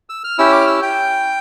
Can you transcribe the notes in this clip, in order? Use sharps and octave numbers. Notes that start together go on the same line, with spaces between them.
E6
F6
C#4 E4 G4 E6
D6
F6
E6
G5